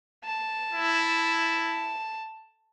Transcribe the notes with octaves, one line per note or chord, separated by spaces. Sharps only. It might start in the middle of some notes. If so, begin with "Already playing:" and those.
A5
E4